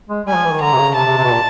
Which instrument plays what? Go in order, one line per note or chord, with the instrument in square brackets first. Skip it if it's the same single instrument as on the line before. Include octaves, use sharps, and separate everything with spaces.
[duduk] G#3
[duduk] G3 [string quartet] G#5
[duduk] F3
E3
D#3
[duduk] D3 [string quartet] A#5
[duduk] C3
C#3
[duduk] C3 [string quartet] A5
[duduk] C3
C3
B2
A#2